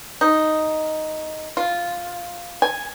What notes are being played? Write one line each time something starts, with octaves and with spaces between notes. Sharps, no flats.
D#4
F4
G#5